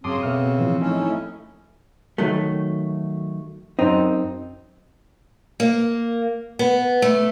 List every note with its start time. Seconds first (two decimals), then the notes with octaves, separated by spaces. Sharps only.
0.04 F#2 C#3 C4 A5 C6 D6 D#6
0.23 B2 A4 E5 F6
0.58 A2 E3 F3
0.81 A3 C#4 D#4 E4
2.18 D#3 F#3 A3
3.79 F#2 C4 D#4
5.60 A#3
6.59 B3
7.02 A3